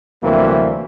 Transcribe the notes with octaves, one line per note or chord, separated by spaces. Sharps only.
D2 C3 E3 F#3 G3 A#3